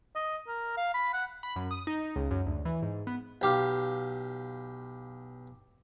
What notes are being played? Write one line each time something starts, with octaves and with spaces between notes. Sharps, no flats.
D#5
A#4
F5
B5
F#5
B5
F#2
D#6
D#4
C#2
F#2
D2
E3
G#2
B3
B1 G4 F5